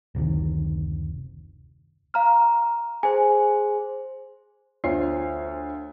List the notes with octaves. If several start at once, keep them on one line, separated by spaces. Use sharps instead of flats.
F#1 D2 C3 D#3
F5 A#5 F6
G#4 C5 G#5
D2 F4 C5 C#5 C7